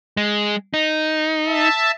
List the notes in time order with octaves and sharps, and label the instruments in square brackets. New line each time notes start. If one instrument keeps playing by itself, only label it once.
[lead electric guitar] G#3
D#4
[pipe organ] E5 A5